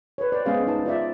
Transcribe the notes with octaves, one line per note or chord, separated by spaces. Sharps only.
B4 C#5
C5 D5
G#3 B3 C#4 G#4 C5 F5
G#3 D#4 B4 A5
F4 C5 D5 E5